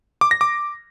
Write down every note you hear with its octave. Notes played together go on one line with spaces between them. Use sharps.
D6
A#6
D6